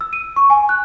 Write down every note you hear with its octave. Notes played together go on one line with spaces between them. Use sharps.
E6
D#7
C#6
G#5
F#6